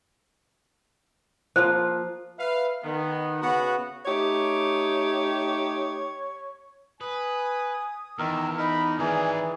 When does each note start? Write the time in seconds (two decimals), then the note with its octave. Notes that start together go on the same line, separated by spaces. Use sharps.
1.56 F3 A#3 F4 C5
2.38 B4 E5 F5
2.83 D#3 B3
3.41 C#3 B3 F#4 F#5
4.05 A3 D#4 G4 C#5
7.01 B4 G#5 D#6
8.19 E2 D#3 A#4 E6
8.58 D#4 A#4 B5
8.99 D#3 E3 G#3 G#4 D5